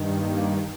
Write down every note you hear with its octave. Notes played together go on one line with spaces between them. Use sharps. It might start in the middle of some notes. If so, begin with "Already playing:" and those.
Already playing: G2 D#3
A#3